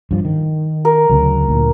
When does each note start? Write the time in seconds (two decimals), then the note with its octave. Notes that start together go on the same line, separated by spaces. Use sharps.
0.11 G2 F3
0.25 D#3
0.85 A#4
1.10 D2 C#3 F#3
1.49 D2 A#2